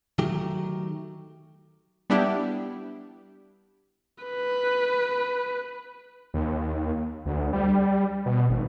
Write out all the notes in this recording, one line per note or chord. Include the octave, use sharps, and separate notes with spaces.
D#3 F#3 A3 G4
G3 B3 D4 E4 G4
B4
D#2
D2
G3
B2
G#1